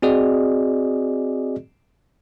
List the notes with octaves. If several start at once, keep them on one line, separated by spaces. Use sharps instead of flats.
C4 F#4 G#4 D5 D#5